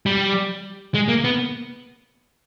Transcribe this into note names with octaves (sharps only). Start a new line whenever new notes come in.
G3
G#3
A#3
B3